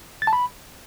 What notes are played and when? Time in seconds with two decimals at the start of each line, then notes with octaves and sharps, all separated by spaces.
0.22 A6
0.27 A5
0.33 B5